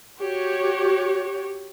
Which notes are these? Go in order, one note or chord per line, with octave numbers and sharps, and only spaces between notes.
F#4 G4 C#5